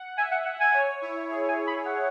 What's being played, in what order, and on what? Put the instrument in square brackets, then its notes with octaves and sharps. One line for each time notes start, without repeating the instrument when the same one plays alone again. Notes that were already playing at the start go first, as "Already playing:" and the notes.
Already playing: [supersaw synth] F#5
[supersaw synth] E5 [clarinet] G#5
[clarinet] F#5
F#5
G#5
[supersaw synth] C#5
E4
G#4
[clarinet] G#5
B5
F#5